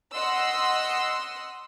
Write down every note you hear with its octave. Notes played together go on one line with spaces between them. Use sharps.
D#5 F#5 C6 E6